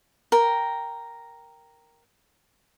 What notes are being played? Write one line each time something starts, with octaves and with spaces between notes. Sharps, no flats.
A#4 G5